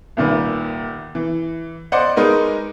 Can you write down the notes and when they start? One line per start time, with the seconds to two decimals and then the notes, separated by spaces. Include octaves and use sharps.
0.17 C2 A#2 D#3 B4
1.15 E3
1.92 C5 D5 D#5 F#5 C6 D6
2.16 G#3 D#4 A#4 B4